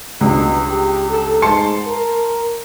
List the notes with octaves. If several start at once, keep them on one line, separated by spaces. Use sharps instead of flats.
C#2 G2 B2
G4
A4
G#2 A5 C6 C#7
A#4